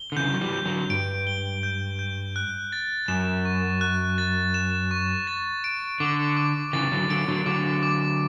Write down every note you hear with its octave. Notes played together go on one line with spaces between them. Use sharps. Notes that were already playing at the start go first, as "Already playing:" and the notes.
Already playing: G7
D3
C#3 E3 G6
F#3
E3 G3
G6
D3 F#3
G2 D7
G7
G6
G6
F#6
A6
F#2 E7
C#6
F#6
A6
E7
C#6
A6
D7
D3 D6
D6
C#3 E3 A6
D3 F#3
D3 F#3 D7
D3 F#3
D3 F#3 D6
D6